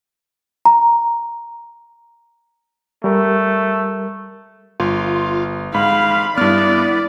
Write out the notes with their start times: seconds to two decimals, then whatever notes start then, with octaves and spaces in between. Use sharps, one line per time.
0.65 A#5
3.04 G3 A3 A#4
4.80 G1 F4
5.74 G#2 F5 B5
6.38 G2 B3 E4 D5 F6